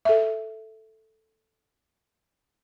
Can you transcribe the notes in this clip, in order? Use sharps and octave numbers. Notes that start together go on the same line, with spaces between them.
A4 E5